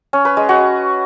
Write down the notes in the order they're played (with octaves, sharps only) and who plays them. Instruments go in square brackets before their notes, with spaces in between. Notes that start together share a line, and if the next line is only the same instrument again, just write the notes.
[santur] C#4
B4
G#3
F#4